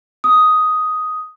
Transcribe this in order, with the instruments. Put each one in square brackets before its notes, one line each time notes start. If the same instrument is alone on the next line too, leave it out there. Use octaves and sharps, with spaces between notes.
[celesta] D#6